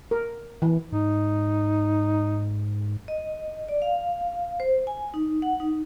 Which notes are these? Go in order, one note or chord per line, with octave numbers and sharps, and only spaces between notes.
A#4
E3
G#2 D#4
D#5
D5
F5
C5
G#5
D#4
F#5
D#4